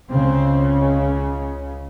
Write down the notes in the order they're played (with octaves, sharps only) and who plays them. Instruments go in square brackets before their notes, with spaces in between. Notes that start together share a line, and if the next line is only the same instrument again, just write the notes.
[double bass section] C#2 C#3 C4